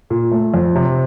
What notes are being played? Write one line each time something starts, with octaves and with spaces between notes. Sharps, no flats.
A#2
A3
F2
C3